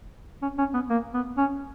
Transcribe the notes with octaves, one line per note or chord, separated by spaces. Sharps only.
C#4
C#4
B3
A#3
B3
C#4